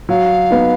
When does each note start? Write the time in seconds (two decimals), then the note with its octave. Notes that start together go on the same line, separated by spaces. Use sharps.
0.09 F#3 F5
0.50 B3 D#4